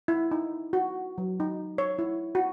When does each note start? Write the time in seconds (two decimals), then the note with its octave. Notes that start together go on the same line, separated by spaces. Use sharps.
0.08 E4
0.31 D#4
0.73 F#4
1.18 F#3
1.40 D#4
1.78 C#5
1.99 E4
2.35 F#4